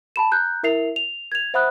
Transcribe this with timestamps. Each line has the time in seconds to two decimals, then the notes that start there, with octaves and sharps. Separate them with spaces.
0.16 A5 B5 E7
0.31 A#5 F#6 G6
0.63 E4 A#4 E5 C7 F7
0.96 F7
1.32 G#6 F7
1.54 C5 E5 F#5 B5 D#6 F#6